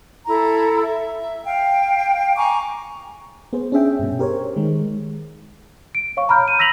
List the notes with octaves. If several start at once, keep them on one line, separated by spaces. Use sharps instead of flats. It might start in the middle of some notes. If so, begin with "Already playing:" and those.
E4 A4 A#5
E5
F5 G5
G#5 A#5 C#6 D6
B3 G#4 C5
C#4 D4 G#4 E5 G5
G2 B2
G4 A#4 C5 C#5
D#3 G#3
D7
C#5 F5 C#6
A#5 B5 F6 G6
D#7
E6 A#6 B6 F7 F#7